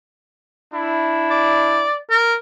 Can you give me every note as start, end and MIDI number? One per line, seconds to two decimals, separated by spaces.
0.74 1.88 62
0.74 1.88 64
1.30 1.97 74
2.10 2.34 70